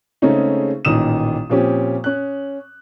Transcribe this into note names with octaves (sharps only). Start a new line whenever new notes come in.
C#3 G#3 A3 C4 C#4 D#4
A1 A#2 D#3 D#6 E7
A#2 F3 C4 C#4 G4
C#4 F#6